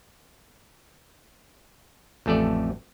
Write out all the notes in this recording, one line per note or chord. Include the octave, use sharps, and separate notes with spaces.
A1 F2 A3 A4 D5